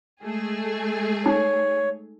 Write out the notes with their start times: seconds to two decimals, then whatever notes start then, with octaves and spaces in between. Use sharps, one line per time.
0.23 G#3 A3 G#4
1.26 D#4 C#5